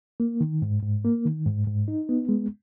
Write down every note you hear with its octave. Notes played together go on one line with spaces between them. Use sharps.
A#3
D#3
G#2
G#2
A#3
D#3
G#2
G#2
D#4
B3
G#3